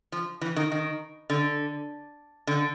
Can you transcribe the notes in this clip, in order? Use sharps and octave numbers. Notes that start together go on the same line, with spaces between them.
F3
E3
D#3
D#3
D3
D3